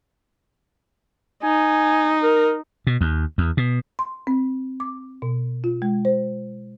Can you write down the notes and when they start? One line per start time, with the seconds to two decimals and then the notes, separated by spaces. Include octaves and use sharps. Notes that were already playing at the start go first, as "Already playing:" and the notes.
1.43 D#4 G#5
2.22 A#4
2.87 B2
3.01 D#2
3.38 E2
3.57 B2
3.99 C6
4.27 C4
4.80 D6
5.22 B2
5.64 F4
5.82 G#3
6.05 C5